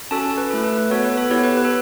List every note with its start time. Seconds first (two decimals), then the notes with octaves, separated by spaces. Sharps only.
0.11 C#4 F#4 A4 A5
0.24 A5
0.38 B4
0.50 A3 E4 A4
0.64 B4
0.77 B4
0.90 B3 F#4 A4 C#5
1.04 B4
1.17 A4
1.30 B3 E4 G4 C#5
1.44 B4
1.57 B4
1.65 A4